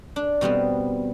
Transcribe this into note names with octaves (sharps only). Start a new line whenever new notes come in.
D4
B2 G3 B3 C4